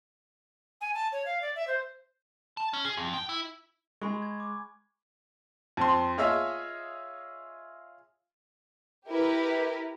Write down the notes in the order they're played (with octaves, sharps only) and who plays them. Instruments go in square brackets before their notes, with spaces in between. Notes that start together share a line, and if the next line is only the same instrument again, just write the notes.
[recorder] G#5
A5
C#5
F5
D5
E5
C5
[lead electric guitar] A5
C#4
G#4
F2
G5
E4
[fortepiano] G#3 [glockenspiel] G#5 B5 C#6
[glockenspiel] G#6
D6
[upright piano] F2 C6
F4 G#4 C#5 D#5 E5 E6
[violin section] E4 G4 A#4 B4